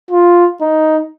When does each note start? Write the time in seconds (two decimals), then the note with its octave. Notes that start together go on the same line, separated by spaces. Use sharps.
0.11 F4
0.61 D#4